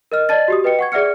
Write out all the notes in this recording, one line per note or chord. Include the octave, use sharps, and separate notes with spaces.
A#4 D#5 F6
D5 D#5 A5 A6
F#4 G4 D#6
B4 D#5 G5 C#7
F#5 C#6 G#6
G#4 D5 E5 F#5 F6 C#7